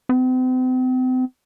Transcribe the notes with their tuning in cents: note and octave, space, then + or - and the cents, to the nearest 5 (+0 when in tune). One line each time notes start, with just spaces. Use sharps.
C4 -40